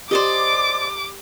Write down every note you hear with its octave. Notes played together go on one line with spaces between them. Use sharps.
G4 C5 D5 D#5 D6